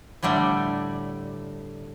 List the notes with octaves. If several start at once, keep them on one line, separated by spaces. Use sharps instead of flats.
A2 D3 G3 A3 D5